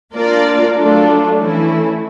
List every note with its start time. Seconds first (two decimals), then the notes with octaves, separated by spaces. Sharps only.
0.14 A#3 D4 F4 A#4 D5
0.75 F#3 A3 D4 F4 A4
1.38 E3 A3 C#4 E4